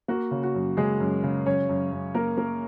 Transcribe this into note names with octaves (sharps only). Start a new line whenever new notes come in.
A#3 F#4
C#3
F#4
F#2
C#3 G#3 G#4
F#2
C#3
F#2 C#4 C#5
F#2
F#2
A#3 A#4
A#3